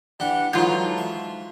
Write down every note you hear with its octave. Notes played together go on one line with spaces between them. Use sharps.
E3 D4 G4 F#5
G#2 E3 F#3 D#4 F4 A4
E5